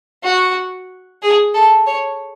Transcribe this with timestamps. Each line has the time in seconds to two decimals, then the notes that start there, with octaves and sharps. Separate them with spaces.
0.24 F#4
1.22 G#4
1.54 A4
1.86 C#5